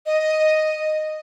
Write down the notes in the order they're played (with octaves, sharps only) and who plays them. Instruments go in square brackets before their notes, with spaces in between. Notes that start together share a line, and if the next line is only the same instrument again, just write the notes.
[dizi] D#5